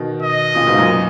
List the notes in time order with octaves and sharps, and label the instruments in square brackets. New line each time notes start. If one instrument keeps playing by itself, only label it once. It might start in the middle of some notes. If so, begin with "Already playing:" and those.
Already playing: [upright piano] B2 D#3
[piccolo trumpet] D#5
[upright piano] A#2 C#3
G#2 B2
F#2 A#2